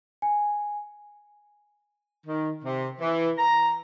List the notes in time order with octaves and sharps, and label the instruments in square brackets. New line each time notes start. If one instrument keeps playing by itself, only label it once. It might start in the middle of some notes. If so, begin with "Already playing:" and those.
[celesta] G#5
[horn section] D#3
C3
E3
A#5